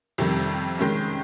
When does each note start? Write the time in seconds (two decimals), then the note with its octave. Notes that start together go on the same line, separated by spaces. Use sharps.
0.18 F2 C3 D#3 G3
0.79 D#3 G#3 C#4